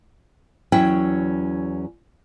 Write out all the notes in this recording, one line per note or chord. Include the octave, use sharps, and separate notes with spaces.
E2 F#3 C#4 E4 G5